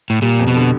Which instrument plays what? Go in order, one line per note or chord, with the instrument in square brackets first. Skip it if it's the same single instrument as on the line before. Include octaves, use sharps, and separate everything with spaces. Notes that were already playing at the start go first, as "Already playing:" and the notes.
[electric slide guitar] A2
[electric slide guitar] A#2 [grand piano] G3
[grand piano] F2
[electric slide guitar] B2
[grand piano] D3